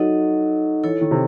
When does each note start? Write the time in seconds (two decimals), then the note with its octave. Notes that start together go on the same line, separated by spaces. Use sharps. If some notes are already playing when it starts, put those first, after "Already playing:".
Already playing: F#3 D#4 A4 D#5 F#5
0.84 E3 E4 A4 C#5
1.01 D#3
1.11 C3